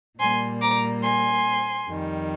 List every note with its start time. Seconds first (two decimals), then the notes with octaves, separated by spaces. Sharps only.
0.19 A#2 G3 A#3 G#5 C6
0.61 A#5 D6
1.02 G#5 C6
1.86 F2 D#3 G3